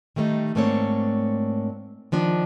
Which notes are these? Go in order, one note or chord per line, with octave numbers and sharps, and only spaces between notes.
D#3 G3 A3 C#4 D#4
G#2 A3 A#3 C4 D4 C#5
D#3 F3 D4